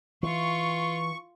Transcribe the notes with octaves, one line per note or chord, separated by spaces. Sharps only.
E3 F4 C#6